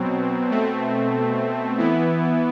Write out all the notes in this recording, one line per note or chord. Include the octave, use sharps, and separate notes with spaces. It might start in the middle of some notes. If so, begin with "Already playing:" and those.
Already playing: B2 F#3 C4
B2 A3 C4
E3 B3 E4